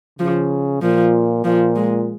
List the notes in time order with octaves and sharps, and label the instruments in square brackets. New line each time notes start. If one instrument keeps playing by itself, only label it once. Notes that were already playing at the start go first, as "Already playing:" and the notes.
[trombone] C#3 [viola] F3
[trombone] A#2 [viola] F3
[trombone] A#2 [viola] F3
[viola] G#3